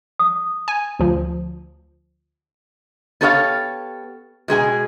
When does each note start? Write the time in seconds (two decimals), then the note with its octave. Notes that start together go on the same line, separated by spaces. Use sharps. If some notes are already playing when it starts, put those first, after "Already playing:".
0.19 D#6
0.68 G#5
0.99 D2 F3
3.21 B3 G4 A4 C#5 E5 F5
4.48 B2 G#3 G#4 G#5